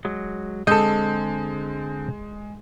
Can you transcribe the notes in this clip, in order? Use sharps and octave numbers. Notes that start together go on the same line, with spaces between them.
F#3 G#3
D3 G#3 C4 A4 D#5 G6